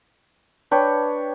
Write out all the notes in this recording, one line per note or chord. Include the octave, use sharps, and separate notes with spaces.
D4 B4 C#5 G5